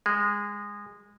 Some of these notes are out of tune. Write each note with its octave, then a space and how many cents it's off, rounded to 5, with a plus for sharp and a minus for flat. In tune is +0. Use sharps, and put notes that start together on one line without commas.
G#3 -20